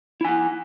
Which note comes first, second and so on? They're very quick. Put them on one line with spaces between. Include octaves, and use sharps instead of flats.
E4 G#5 F#5